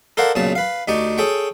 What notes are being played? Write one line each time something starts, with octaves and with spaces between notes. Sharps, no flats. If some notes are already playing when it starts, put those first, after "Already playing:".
A4 A#4 C5 D5 F5 F#5
B1 A#2 C#3 C#5 A5
B4 F5
D2 D#4 G4 D5 C#6
G#4 A4 C#5 G5 C#6